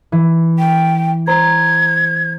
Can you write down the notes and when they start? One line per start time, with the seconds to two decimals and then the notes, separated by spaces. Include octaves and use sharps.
0.12 E3
0.59 G5
1.27 C5 A#5 G#6